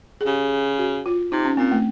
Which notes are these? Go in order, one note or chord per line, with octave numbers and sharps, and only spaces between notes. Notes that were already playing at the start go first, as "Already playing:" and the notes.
G#4
C#3 G4
F#4
F4
C3 D#4
C#4
A#2 C4
A3